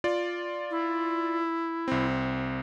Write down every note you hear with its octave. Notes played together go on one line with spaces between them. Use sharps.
F4 D5
E4
C2 C4